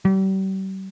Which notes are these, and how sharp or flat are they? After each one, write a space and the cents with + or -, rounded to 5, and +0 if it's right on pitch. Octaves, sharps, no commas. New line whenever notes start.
G3 -40